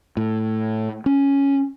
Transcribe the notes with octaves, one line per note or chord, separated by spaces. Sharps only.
A2
C#4